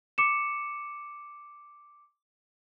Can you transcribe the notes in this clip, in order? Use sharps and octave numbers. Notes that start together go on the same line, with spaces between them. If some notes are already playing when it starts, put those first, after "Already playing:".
D6 C#7 E7